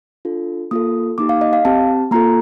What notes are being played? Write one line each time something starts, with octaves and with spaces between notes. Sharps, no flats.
D4 F4 A4
A#3 F4 A4 D#6
A#3 D#4 G4 D6
F5
D#5
F5
C4 G4 A5
A#3 F4 A4 A#5